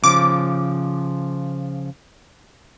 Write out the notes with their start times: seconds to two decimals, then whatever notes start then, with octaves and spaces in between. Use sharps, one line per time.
0.04 C#3 F3 D6